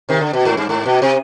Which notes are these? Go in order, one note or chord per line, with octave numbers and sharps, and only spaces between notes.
C3 D#3
D3
B2
G#2
G2
G#2
B2
C3